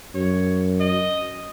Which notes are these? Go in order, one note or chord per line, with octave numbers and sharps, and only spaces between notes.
F#2 C#5
D#5